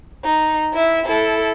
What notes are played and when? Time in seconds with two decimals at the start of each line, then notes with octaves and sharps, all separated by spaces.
0.24 D#4
0.74 E4 E5
1.06 E4 A4